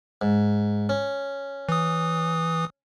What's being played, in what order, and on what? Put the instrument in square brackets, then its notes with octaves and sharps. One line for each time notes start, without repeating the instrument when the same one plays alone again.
[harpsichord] G#2
C#4
[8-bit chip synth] E3 D#6